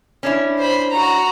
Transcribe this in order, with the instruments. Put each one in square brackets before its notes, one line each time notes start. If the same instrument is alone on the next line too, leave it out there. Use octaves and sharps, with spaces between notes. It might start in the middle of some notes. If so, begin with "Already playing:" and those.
[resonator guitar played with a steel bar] C#4 D4 E4
[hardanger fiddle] C5 B5
F#4 A#5